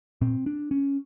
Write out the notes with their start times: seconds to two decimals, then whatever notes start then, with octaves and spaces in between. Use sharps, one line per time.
0.21 A#2 C4
0.46 D4
0.71 C#4